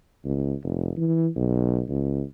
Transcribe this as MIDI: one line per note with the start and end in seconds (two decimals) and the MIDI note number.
0.25 0.54 37
0.63 0.90 29
0.97 1.28 52
1.36 1.81 35
1.88 2.22 37